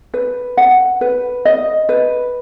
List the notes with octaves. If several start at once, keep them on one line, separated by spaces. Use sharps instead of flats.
B4
F#5
B4
D#5
B4